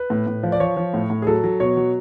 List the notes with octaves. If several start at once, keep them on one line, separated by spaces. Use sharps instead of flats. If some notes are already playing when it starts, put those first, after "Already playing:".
Already playing: B4
A2
A2
F3
D5
F3 C#5
F3
A2
A2
G#4
F#3 A4
F#3
B2 C#5
F#3